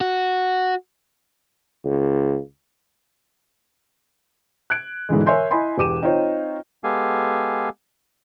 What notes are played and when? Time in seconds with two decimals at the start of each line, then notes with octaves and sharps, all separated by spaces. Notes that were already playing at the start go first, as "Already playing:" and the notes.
0.01 F#4
1.85 C#2
4.70 F#6 G#6 D7
5.09 G#2 B2 D3 E3 G#3
5.26 A#4 C#5 E5 G#5 C6 G6
5.51 E4 D#5 G#5 B5 C6
5.78 E1 G4 D6 D#7 E7
6.02 C4 D#4 F4 C5 C#5
6.84 G#3 B3 G4 A4 F5 G#5